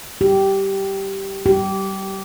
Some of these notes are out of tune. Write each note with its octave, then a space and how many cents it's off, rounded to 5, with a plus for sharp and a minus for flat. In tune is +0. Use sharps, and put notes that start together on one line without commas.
G4 -10
G4 -25